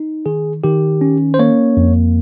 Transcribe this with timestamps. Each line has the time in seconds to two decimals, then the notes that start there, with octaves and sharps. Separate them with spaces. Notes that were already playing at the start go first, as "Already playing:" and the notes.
Already playing: D#4
0.26 D#3 G#4
0.64 D#3 G4
1.01 C#4
1.34 C5
1.39 A#3 C#5
1.77 F2